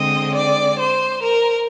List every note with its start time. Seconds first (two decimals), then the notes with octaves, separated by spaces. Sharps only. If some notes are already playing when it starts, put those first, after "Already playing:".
Already playing: D3 G#3 C4 D#5
0.35 D5
0.79 C5
1.23 A#4